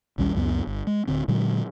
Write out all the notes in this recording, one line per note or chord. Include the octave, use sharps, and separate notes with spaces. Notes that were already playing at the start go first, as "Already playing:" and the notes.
A#1 D#2 G3 C#4
C#2 F#2 F#3 B3
G1
G#3
D1 D3 C4
A#2 D3 F#3 G#3